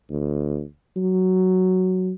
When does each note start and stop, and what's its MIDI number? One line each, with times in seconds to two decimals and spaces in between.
0.10 0.63 38
0.96 2.11 54